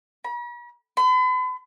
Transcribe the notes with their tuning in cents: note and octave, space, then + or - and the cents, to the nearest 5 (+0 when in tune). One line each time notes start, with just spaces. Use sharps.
B5 -45
B5 +45